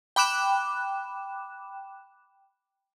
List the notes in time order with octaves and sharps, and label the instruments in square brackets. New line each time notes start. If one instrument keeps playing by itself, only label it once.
[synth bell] G5 B5 D6 F#6 E7